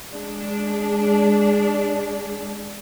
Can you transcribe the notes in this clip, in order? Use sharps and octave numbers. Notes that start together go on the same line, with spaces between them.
G#3 D4